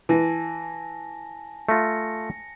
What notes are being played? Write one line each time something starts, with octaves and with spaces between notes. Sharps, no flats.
E3 G#5 A5 A#6
A3 F4 A#6 C#7